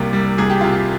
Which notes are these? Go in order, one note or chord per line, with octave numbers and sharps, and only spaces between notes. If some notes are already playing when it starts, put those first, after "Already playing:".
Already playing: C2 C3 G3 A#3 G4
G3
C2 G#4
G4
C3 F4
G4